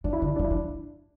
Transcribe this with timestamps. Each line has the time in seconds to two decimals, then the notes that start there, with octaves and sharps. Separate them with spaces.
0.04 E3 D4
0.13 E4
0.20 D3 D4
0.28 E4
0.36 D4
0.39 E3
0.44 E4
0.50 F3 D4